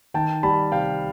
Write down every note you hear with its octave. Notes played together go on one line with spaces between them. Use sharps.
D#3 G5 A5
G3 A5 B5
C3 F5 G5